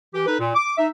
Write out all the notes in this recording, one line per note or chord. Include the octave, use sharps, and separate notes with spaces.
E3 G4
D#4 A4 B4
A#2
D6
D#4 E5